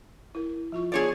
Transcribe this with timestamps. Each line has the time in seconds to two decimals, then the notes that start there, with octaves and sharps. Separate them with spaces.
0.35 E4 A#4
0.72 F3 F4 C#6
0.92 B3 D4 F4 G#4 C#5 D5